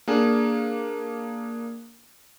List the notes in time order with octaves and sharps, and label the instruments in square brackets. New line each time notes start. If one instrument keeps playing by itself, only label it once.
[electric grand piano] A#3 D4 G#4